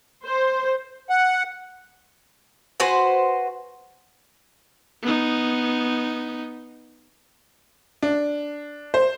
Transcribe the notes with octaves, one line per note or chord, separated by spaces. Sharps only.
C5
F#5
F#4 B4 C5 G#5
B3 D#4
D4
C5